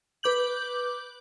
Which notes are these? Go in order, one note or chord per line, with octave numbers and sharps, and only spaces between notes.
B4 D6 G6 F#7